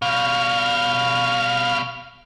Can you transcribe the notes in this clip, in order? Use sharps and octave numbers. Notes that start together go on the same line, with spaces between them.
B2 G3 F5